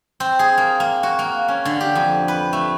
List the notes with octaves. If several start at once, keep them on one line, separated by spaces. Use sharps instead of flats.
C4
G#4
A#3
A#3
F#4
A#3
C#4
D3
G4
F2
B4
A3